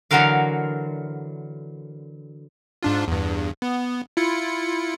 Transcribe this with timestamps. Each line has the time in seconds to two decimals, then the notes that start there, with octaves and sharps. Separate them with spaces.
0.11 D3 E3 F#3 F#4 A#4 F5
2.83 G#2 D4 F4
3.08 E2 G2
3.62 B3
4.17 E4 F4 C#7